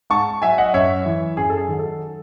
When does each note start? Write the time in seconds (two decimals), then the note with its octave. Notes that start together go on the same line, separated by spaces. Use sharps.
0.10 G#2 A5 C#6
0.42 F#3 E5 G#5
0.58 D#5 F#5
0.74 F#2 C#5 E5
1.06 E3
1.37 F#2 G#4
1.50 A4
1.58 G#4
1.68 D#3 F#3
1.79 A4